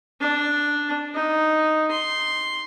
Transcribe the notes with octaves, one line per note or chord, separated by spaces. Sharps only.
D4
D#4
C6